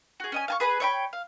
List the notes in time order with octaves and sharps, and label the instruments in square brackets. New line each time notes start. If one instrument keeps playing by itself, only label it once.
[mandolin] F#4 G#4
C#4 D#5 G#5
F5 G#5 C#6
G#4 B4 B5
C#5 E5 G5 B5
F5